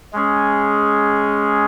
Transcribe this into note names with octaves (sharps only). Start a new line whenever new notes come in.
G#3 C#4 G#4